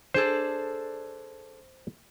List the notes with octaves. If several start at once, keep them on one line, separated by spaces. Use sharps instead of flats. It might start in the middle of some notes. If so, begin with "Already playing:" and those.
D4 G#4 A4 C5